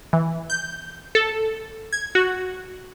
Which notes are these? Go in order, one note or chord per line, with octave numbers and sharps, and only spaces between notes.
E3
G6
A4
G#6
F#4